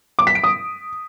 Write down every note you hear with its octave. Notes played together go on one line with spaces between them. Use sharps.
D6
B6
D7
D#6